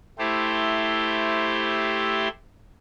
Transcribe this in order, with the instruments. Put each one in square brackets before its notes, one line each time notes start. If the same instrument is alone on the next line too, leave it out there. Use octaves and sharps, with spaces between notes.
[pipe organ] A3 E4 G4 C5